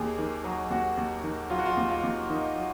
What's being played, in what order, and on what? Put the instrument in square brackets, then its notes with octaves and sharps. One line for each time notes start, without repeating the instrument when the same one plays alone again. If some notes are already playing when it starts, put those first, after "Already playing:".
Already playing: [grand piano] D#2 G#4
D#3
F#3
D#2 F#4
D#2
D#3
F#3 F4
F#4
F4
D#2
F4
D#2
D#3 D#4
F#3